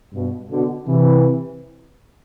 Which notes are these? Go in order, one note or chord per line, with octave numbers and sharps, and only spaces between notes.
G2 B2
B2 D3
C3 E3